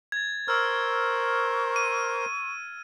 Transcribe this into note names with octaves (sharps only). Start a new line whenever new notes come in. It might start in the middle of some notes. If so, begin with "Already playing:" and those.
G#6 A6
A#4 C5 C#6 E6 F6
D#7